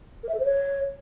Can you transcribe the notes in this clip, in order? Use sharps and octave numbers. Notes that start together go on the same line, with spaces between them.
A#4
E5
A4
C5
C#5